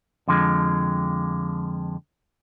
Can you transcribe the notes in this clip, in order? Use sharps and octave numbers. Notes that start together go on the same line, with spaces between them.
F2 D3 F3 G#3